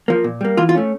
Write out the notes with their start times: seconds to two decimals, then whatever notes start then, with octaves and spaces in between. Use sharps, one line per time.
0.08 F3 A#3
0.24 A#2
0.41 G3 A#3
0.57 E3 F4
0.69 F4
0.75 A3 C#4